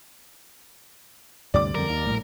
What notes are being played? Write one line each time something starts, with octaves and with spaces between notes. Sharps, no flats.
D2 G2 C3 D5 D6
F2 D3 G3 A#4
D#2
A#1 A2 G3